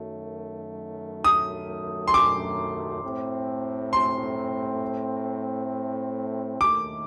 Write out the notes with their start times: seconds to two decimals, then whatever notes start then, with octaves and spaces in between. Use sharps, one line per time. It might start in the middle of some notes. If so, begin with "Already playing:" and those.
Already playing: F#2 D#3 F#3 A3
1.24 D#6
2.08 C6
2.14 D6
3.03 A2 A3 C4
3.93 C6
6.60 D#2 D#3 A3 D6